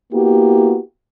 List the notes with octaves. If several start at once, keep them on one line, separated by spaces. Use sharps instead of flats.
A#3 B3 E4 F#4 G4